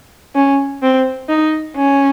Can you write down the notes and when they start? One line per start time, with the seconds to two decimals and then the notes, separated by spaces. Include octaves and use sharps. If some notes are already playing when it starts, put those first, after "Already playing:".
0.35 C#4
0.82 C4
1.29 D#4
1.76 C#4